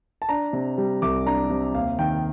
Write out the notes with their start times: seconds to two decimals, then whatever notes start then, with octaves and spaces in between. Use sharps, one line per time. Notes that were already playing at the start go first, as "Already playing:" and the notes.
0.22 A5
0.29 D4 A#5
0.53 C3
0.78 G3
1.02 C2 D6
1.26 D4 A#5
1.50 C3
1.75 D#2 F5
1.99 D#3 G5